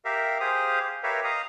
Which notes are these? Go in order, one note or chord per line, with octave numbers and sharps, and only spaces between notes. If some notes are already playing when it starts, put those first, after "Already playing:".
G4 A#4 E5 F5
G4 G#4 C5 F5 D#6
G4 A#4 B4 C#5 E5 F5
D#5 F5 A#5 D#6